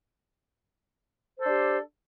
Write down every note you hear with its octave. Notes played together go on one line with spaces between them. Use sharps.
D4 G4 A4 C5